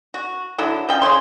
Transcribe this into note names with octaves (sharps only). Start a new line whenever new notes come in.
F#4
D3 F#3 E4
F3 C#4 G5
C#3 D#4 C#5 C6